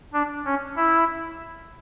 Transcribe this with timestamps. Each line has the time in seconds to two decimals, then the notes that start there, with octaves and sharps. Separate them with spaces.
0.13 D4
0.45 C#4
0.76 E4